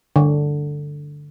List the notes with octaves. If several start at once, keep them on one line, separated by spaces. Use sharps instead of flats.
D3